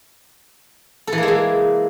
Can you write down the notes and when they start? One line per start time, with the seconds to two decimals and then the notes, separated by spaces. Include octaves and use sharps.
1.07 A4
1.13 E3
1.18 A#3
1.23 G#3
1.28 E3